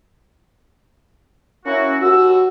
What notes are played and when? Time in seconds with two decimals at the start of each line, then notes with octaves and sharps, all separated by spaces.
1.66 A#3 C#4 E4 F#4
2.02 D#2 F#4 E6